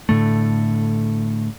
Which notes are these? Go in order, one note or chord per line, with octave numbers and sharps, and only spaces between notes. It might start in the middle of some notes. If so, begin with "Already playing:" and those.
A2 D3 A3